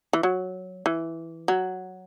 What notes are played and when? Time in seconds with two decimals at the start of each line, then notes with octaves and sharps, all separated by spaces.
0.13 E3
0.23 F#3
0.86 E3
1.48 F#3